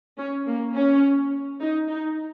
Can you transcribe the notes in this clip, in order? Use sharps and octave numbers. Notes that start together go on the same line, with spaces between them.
C#4
A#3
C#4
D#4
D#4